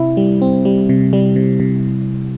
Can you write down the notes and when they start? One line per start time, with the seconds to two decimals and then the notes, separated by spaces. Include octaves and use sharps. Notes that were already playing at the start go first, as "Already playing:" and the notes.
Already playing: C3 C4 E4
0.17 G3
0.42 C4
0.65 G3
0.89 C3
1.13 G3
1.36 C3
1.60 C3